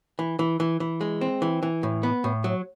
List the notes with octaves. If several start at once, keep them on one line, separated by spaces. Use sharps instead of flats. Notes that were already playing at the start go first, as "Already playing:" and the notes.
E3
E3
E3
E3
G#3
C4
E3
E3
A2
B3
A2
F#3